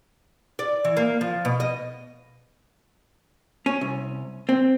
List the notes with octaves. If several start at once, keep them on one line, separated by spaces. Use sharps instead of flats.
D5
E3
A#3
F3
B2
D#5
C#4
C2
C4